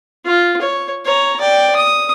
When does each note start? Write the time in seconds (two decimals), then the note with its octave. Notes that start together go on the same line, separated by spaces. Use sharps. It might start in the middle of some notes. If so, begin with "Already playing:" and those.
0.25 F4
0.61 C#5
1.05 C#5 A#5
1.40 D5 G5
1.76 D#6